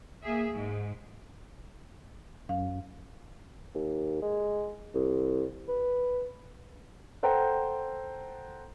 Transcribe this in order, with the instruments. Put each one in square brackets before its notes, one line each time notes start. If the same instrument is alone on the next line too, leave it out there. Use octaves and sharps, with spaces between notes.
[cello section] A#3 G#4 E5
G#2
[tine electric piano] F#2 [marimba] F5
[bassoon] D#2
G#3
C2
B4
[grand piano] A4 C5 F#5 G5 A#5